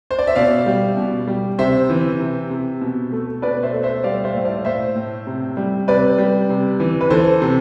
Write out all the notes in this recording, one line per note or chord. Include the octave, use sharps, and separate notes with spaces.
C5
D5
E5
B2 D5 F5
G3
B2
G3
C3 C5 E5
E3
C3
C3
B2
A3
B2 B4 D5
C5 E5
A3
C5 E5
G3 D5 F5
C5 E5
A2
D5 F5
A2 C5 E5
A2
C3
G3
C3 B4 D5
G3
C3
E3
B4
E3 A4 C5
C3